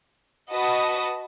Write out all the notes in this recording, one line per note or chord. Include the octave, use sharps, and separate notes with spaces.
F#4 B4 D#5 A5